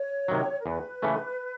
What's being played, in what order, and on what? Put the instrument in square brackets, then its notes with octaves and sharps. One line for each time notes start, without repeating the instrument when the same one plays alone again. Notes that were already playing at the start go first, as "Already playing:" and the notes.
Already playing: [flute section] C#5
[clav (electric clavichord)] C3 D#3 F#3
[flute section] A#4
[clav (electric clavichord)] E2 [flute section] B4
[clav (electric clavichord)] C#3 E3 A3 C#4